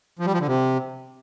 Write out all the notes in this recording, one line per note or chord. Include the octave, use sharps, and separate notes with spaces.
F3
G3
F3
D3
C3